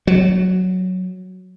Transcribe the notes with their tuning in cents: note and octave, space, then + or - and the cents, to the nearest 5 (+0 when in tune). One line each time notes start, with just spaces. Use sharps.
F#3 +0